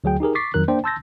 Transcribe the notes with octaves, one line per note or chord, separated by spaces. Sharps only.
D2 F#3 G#4 G5
D#4 G4 G#4 A#4
C#6 D6 A6 B6 C7
F2 D#3 F#3 A#4 F#6
A#3 D4 C5 D5 G5
A5 C6 E6 G6 A6 A#6